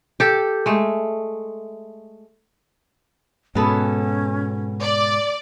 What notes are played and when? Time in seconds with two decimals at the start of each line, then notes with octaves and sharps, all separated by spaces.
0.20 G4 A4
0.66 G#3 A3
3.55 G#2 B2 F#3 B3 C#4 A4
4.82 D5